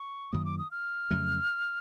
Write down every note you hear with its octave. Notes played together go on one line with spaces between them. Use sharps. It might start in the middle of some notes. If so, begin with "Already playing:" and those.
Already playing: C#6
F#2 D#3 F#3 A#3 D#6
D6
D#6
F6
F2 C#3 F#3 A3